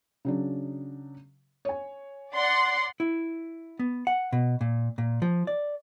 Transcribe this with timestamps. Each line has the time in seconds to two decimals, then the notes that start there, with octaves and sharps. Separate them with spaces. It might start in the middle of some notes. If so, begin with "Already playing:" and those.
0.25 C#3 F#3 D4
1.65 C#5 G#5
2.34 D5 F#5 C6
3.00 E4
3.79 B3
4.07 F#5
4.33 B2
4.61 A#2
4.98 A#2
5.22 F3
5.47 D5